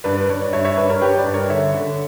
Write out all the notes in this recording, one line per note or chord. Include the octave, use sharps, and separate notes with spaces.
G2 B4 D5
B4
G2 C#5
D5
G2 C#5 E5
C#5 E5
G2 B4 D5
A#4 C#5
G2 G4 B4
B4 D5
G2
A#4 C#5
D3 C#5 E5
D3